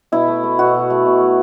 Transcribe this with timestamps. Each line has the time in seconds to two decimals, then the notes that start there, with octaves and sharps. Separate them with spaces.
0.12 B2 E4
0.27 A3
0.44 A3
0.59 B2 F#4
0.75 B2
0.90 A3
1.06 B2
1.21 A3